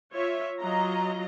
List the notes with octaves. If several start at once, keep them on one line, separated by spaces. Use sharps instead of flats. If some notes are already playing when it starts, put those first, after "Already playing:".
F4 C#5 E5
F#3 F4 D#5 A#5